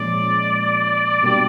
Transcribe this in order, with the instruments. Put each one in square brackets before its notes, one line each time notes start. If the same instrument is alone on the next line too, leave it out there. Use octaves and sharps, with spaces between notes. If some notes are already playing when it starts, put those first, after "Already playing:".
Already playing: [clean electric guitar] A#2 F3 G#3 C#4 [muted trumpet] D5
[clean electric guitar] B2 G3 A#3 D4 G4